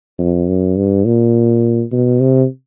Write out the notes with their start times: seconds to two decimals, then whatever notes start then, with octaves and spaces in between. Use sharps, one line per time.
0.19 F2
0.48 F#2
0.76 G2
1.05 A#2
1.92 B2
2.20 C3